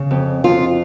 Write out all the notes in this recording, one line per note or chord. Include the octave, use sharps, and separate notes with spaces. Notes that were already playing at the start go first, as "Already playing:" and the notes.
Already playing: C#3
F2
F2 F4